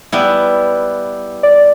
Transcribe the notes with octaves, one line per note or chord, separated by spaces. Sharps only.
G3 B3 E4
D5